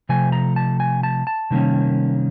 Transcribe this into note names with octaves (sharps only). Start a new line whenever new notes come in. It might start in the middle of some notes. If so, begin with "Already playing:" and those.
C3 F3 A3 G#5
A#5
A5
G#5
A5
A5
C3 D#3 G3 A#3 C#4